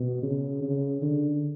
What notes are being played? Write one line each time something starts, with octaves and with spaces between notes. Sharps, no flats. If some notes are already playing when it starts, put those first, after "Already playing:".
Already playing: B2
C#3
C#3
D3